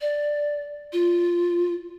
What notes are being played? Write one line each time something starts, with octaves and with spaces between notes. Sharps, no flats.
D5
F4